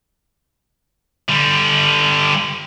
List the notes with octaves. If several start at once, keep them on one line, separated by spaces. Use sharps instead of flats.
D3 G3